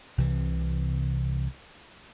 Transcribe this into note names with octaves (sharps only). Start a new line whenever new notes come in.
C2 C3 E3